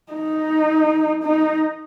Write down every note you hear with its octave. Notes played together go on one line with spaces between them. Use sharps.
D#4
D#4